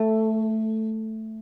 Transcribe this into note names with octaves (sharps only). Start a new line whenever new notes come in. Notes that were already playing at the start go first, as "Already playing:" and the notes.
Already playing: A3